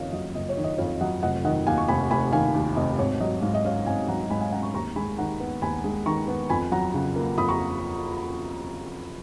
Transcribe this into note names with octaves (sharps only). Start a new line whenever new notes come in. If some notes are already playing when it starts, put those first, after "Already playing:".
Already playing: F#1 F2 D#3 C#5 D#5 F5
F#3 D#5
F#1 D#5
C#5
D#3
D#5
F2 C#5 F5
F#3 D#5 F#5
F1 D#5 F#5
D#3 D#5 F#5
D#2 F5 G#5
C#6
F1 G#5 B5
F1 G#5 B5
D#3 F5 G#5
D#2
F1 D#5
G#1 C#5
F#3 D#5
G#2 F5
D#5
C#4 C#5 F5
G#1 F5 G#5
F#3 F#5 A#5
G#2 G#5 B5
F5 G#5
C#4 F#5 A#5
A#5 C#6
D#2 A#5 C#6
G#3 G#5 B5
D#3 F#5 A#5
B3
D#2 G#5 B5
G#3
D#3 A#5 C#6
B3
F2 G#5 B5
F#3 F#5 A#5
C#3
A#3
F2 B5 D#6
A#5 C#6